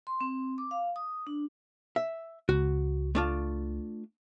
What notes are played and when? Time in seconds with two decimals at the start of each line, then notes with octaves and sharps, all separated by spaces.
0.07 C6
0.21 C4
0.58 D6
0.71 F5
0.96 D#6
1.27 D4
1.96 E5
2.49 C#2 F#4
3.15 A3 D4 F4